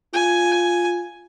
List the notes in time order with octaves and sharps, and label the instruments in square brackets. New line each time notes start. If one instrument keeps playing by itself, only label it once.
[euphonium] F4 [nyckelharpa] G#5